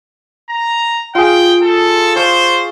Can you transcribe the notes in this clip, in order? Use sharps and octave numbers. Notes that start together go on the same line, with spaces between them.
A#5
F4 G#4 G5
A4
C5 D5 F5 C#6